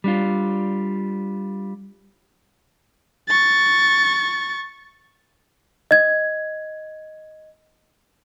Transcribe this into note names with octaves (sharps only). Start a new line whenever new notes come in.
G3 D4 F4
C#6 A6
D#5 G#6